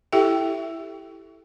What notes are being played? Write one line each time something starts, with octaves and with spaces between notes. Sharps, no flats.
E4 G4 A4 E5 G5